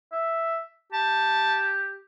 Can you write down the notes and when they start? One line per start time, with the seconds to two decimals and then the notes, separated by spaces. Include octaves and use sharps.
0.13 E5
0.93 G4 A5